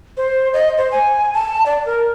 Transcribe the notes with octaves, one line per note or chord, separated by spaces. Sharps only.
C5
D#5
C5
G#5
A5
D5
A#4